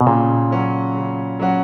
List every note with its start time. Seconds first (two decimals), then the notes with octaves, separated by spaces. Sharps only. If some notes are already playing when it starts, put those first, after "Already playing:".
0.01 B2
0.06 A#2 C#3
0.51 F#3 C#4 F#4
0.95 C#3
1.39 F#3 C#4 F#4